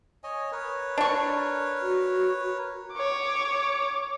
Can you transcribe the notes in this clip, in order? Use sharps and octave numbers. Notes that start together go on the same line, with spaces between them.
C#5 D#5 G#5
A#4 B4 C#5
D4 C#6
F#4
C#5 D6